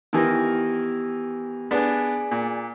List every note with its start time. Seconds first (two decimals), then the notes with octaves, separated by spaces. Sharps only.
0.13 D#3 E3 B3 G4 A#6
1.71 B3 D4 G#4 D5 G#5
2.31 A#2